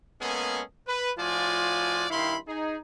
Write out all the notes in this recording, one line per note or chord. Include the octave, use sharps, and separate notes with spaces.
G#3 A#3 B3 C#4 G#4 A4
B4
A2 F3 F4 F#4 D5 G#5
G2 D#3 E4 F5 B5 C6
D#4 G#4